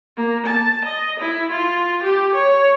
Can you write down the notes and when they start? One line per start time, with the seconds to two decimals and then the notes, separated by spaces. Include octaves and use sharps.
0.17 A#3
0.46 A5
0.85 D#5
1.19 E4
1.51 F4
2.03 G4
2.34 C#5